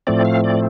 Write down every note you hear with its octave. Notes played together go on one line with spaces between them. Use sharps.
A2 F3 A3 C4 D5
F5
D5